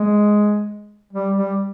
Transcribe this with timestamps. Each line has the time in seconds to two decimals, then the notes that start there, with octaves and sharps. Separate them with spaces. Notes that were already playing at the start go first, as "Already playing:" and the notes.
Already playing: G#3
1.13 G3
1.36 G3